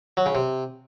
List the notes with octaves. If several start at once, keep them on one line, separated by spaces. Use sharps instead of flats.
F#3
C#3
C3